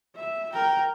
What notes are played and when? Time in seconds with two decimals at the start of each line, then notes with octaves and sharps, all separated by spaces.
0.16 E5
0.53 A#4 G5